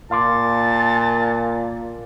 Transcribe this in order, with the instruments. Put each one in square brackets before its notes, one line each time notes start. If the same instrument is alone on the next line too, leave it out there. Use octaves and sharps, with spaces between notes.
[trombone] A#2 [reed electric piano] F5 C6 D6 [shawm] A5